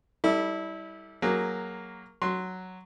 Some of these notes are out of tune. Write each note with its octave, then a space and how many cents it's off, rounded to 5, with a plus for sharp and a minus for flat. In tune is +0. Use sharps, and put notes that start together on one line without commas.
G3 +0 E4 -25 A4 +15
F#3 +0 A#3 +0 G#4 +0
F#3 +0 C6 +0